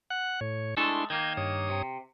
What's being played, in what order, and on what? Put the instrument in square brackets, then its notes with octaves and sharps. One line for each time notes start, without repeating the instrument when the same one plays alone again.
[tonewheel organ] F#5 F#6
A2 C#5
[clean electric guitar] G#3 A3 A4 [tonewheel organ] D4 E4 C6
[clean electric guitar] D#3 A#3 [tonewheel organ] D#5 G6 G#6
[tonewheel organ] G2 C#5 D#6
[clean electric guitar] C3